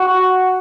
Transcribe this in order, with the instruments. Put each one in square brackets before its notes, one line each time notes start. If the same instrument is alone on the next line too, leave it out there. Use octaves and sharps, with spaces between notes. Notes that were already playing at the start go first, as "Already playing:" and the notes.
Already playing: [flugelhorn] F#4